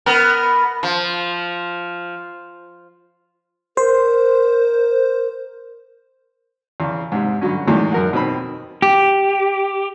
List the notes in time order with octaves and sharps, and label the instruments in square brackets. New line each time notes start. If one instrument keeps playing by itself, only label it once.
[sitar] B3 A#4
F3
[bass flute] A#4 [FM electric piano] C5
[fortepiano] E2 C#3
G#2 C3
G2 D3 F#3 C#4
E2 A2 D#3 F#3 G#3
F#2 A#4 F#5
B2 D#3 C4 B5
[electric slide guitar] G4